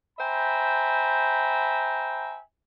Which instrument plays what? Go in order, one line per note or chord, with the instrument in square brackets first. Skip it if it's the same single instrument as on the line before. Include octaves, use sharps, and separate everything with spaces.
[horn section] C5 E5 G5 G#5 A#5 B5